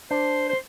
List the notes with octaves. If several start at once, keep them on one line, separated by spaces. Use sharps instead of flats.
D4 C5
C5